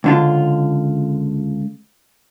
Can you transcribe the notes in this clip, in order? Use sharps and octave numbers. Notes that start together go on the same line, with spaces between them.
C#2 D3 F4